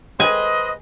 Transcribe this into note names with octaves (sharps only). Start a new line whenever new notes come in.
B4 C5 D#5 G#5